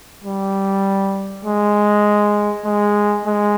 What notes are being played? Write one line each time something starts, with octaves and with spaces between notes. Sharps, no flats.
G3
G#3
G#3
G#3